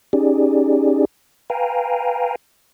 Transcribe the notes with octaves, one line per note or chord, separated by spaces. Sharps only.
C#4 D#4 G4 G#4 D5
B4 F5 G5 G#5 A#5